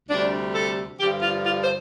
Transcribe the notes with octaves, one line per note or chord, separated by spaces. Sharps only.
D2 C3 G3 D4
A4
G2 D3 F3 G4
F4
F4
C5